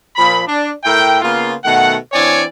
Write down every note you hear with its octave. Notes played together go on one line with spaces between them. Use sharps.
A#2 F3 A#3 B5
D4
A2 A#4 E5 G5
C#3 A#3 B3 F4
B2 D#3 A3 F#5
E3 C4 D4 C#5 D5 G#5